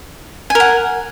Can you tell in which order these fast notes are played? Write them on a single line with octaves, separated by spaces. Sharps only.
G#5 A#4 F#5